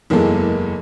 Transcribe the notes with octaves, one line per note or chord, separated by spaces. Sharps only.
F#1 E2 E3 G#3 A#3 A4